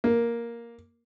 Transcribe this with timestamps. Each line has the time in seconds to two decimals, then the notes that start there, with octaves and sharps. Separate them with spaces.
0.04 A#3